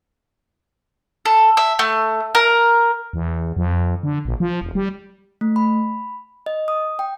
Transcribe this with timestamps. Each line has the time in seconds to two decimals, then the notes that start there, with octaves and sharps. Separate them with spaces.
1.26 A4
1.57 E5
1.79 A3
2.35 A#4
3.13 E2
3.57 F2
4.03 D3
4.25 A#1
4.40 F3
4.61 E1
4.75 G3
5.41 A3
5.56 B5
6.46 D#5
6.68 D#6
6.99 G5